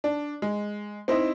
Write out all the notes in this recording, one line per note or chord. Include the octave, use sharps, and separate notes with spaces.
D4
G#3
C4 D#4 E4 C5 D#5